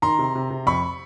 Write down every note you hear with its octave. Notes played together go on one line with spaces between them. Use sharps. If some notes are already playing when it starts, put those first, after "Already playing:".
D#3 A#5 C6
C3
C3
C3
F2 B5 C#6